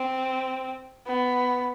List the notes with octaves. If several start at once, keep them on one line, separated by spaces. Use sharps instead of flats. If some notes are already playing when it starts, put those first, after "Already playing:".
Already playing: C4
B3